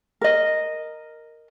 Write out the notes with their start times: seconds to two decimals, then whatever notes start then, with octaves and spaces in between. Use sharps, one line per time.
0.21 A#4 D#5